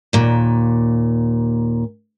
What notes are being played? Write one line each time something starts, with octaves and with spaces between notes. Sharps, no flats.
D#2 A#2